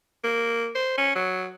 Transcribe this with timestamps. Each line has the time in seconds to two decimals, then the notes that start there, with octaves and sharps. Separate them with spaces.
0.24 A#3
0.75 C5
0.98 C#4
1.15 F#3